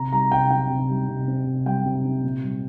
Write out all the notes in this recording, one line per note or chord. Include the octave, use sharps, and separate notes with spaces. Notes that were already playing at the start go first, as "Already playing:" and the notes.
Already playing: C3 A#5
G3 A#5
C3 G5
C4 G5
C3
G3
C3
C4
C3
G3 G5
C3
C4
A#2
G3